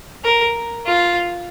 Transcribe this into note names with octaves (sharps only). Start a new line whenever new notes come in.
A#4
F4